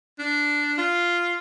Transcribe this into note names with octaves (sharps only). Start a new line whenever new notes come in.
D4
F4